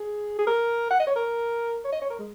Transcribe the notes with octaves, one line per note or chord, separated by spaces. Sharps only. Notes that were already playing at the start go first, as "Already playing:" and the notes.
Already playing: G#4
G#4
A#4
F#5
D#5
C#5
A#4
C#5
D#5
C#5
A#4
G#3